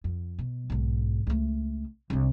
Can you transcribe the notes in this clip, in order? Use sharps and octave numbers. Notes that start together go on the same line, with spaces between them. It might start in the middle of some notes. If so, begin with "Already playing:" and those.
F2
B2
B1 G#2
C#2 A3
C2 D4